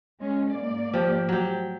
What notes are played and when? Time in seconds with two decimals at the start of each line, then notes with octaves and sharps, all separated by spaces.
0.20 G#3 C#4
0.52 G#2 A#3 D5
0.93 F3 G4
1.29 F#3 A3 G4